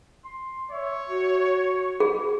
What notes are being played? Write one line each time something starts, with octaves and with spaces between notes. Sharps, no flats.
C6
C#5 E5
F#4
G#4